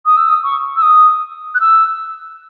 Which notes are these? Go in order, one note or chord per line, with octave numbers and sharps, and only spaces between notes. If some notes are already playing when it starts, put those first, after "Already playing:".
D#6
E6
D#6
C#6
E6
D#6
F#6
E6